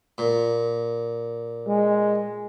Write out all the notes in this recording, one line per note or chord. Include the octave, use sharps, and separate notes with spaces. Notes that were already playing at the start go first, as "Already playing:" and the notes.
A#2
G#3